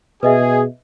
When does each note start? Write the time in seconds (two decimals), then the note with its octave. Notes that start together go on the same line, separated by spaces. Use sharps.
0.23 B2 G#4 B4 D#5 E5